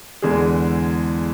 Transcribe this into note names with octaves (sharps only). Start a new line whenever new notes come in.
E2 D3 G#3 G#4